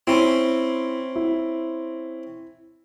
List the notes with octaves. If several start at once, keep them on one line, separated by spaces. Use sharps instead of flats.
C4 C#4 E4 B5
E4